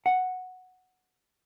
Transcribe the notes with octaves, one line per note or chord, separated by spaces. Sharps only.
F#5